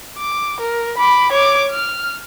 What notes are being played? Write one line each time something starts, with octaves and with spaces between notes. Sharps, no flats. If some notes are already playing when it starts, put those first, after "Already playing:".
D6
A#4
B5 D6
C#5 D6
F6